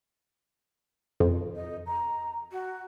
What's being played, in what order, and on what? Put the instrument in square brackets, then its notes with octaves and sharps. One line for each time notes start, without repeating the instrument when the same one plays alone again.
[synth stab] F2
[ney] D#5
A#5
F#4